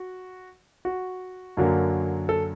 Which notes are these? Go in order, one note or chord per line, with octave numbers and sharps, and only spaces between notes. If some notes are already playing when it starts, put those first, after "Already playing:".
Already playing: F#4
F#4
F#2 D3 F#3 A#3
A4